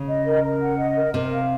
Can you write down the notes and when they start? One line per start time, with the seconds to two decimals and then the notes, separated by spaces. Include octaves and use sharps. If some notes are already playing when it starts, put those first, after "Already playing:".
Already playing: C#3
0.09 D#5
0.26 A#4
0.44 A#4
0.62 F#5
0.79 D#5
0.97 A#4
1.14 C3 A#4
1.32 F5